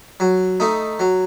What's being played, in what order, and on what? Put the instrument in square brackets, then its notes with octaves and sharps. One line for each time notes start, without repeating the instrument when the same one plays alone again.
[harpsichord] F#3
A3 D#4
F#3